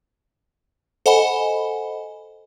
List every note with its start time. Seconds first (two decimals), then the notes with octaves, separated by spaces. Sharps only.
1.06 A4 C5 D#5 F#5 G#5 B5